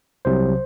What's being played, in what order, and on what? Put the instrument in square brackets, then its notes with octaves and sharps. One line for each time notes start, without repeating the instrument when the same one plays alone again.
[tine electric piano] C2 C3 F#3 C5